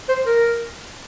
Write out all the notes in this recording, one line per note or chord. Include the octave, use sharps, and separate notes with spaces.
C5
A#4